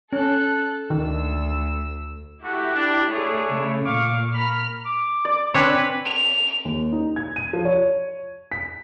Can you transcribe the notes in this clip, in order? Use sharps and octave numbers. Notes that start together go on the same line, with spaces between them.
C#4 A4 F#6
D2 D#3 E6
A3 E4 F#4 G4
D4
A3 D4 E4 G#4 C#5
C#3 A3
A#2 F5 C#6 D6
A#4 B5 F6
D6
D5
C4 D4 B4 C#5 G#5
F7
D#2
D#4
G#6
D#7
F3
C#5
B6